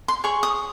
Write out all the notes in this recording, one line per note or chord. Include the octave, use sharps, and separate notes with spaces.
C6
G#4 C#5 C#6
D#6